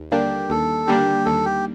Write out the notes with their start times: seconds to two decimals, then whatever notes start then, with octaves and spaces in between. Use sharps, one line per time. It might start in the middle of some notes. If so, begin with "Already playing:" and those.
Already playing: D#2
0.12 D3 G3 A#3 D4 G4
0.50 D#2 A4
0.87 D3 G3 A#3 D4 G4
1.25 D#2 A4
1.45 G4